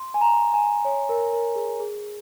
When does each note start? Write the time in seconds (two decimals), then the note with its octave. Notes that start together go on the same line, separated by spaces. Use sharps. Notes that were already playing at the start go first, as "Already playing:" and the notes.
Already playing: C6
0.14 G#5
0.21 A#5
0.54 G#5
0.85 C#5
1.09 A#4
1.33 A#4
1.56 G#4
1.80 G#4